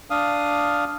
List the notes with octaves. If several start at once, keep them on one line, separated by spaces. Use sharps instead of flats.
D4 F5 D#6